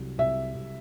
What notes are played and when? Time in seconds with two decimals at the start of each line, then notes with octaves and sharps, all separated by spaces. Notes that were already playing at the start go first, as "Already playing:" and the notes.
Already playing: C2 F#3
0.18 C2 E5
0.54 C2